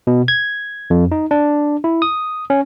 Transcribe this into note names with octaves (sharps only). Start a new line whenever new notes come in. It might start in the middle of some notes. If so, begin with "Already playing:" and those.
B2
G#6
F2
D#4
D4
E4
D#6
C#4